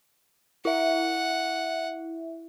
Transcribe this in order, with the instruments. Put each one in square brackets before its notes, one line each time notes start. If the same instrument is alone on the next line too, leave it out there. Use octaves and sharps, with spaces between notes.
[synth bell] E4 E5 [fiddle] F#5